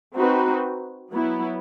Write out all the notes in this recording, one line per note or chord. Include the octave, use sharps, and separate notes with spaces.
C4 D#4 F#4 B4
F#3 B3 E4